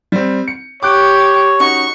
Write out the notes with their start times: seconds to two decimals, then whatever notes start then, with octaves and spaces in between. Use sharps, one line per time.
0.12 G3 C4
0.48 C#7
0.83 G4 C#5 D6 F#6 D7
1.60 C#4 D#4 F#4 C#6